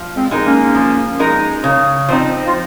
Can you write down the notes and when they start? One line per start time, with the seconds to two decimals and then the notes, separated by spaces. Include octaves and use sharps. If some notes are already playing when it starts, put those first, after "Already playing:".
Already playing: F3
0.15 G#3 C4
0.31 G#3 D#4 A#4
0.46 A#3 C#4
0.75 F3
1.19 G#3 D#4 A#4
1.64 C#3
2.08 F3 C4 D#4
2.47 F4